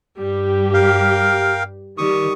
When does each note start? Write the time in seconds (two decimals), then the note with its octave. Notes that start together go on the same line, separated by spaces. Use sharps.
0.18 G2 G3 G4
0.74 A#4 F5 G5
1.98 D#3 G3 C#6 D#6